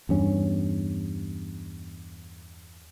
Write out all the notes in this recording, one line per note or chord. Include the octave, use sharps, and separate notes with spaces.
E2 G2 C#4